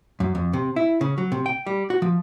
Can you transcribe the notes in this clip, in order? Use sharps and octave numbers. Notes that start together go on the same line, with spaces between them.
F#2
F2
C3
E4
C#3
F#3
C3
G5
G3
F#4
F3